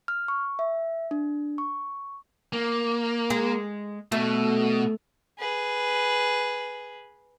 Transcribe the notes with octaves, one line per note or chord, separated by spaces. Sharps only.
F6
C#6
E5
D4
C#6
A#3
G#3 G#4
B2 A3
G#4 B4